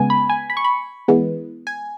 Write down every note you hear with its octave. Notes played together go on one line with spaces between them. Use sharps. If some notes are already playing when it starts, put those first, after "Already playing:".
Already playing: C#3 G#3 B3 G#5
B5
G#5
B5
C#6
B5
E3 G#3 B3
G#5